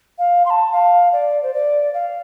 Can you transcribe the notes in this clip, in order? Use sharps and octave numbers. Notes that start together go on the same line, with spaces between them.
F5
C6
A5
F5
D5
C5
D5
F5